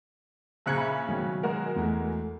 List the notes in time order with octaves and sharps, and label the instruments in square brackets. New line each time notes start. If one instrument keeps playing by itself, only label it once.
[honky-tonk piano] A#1 C#3 C#7 [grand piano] A#5 F#6 G#6
[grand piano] E5 B5
B2 D#3 F#3
[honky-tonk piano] G#3 F#4 A#4
[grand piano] E2 A3